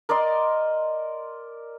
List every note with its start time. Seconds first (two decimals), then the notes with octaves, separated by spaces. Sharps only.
0.09 A#4 D5 D#5 C6